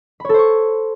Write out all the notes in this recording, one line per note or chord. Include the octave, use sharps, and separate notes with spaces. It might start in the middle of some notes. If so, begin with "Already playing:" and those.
A4 C5 C#5 B5 C#6